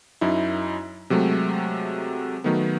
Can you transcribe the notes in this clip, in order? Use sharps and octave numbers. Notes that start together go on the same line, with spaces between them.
F#2 D#4 E4
C3 F#3 G#3 A3
D#3 F#3 A3 B3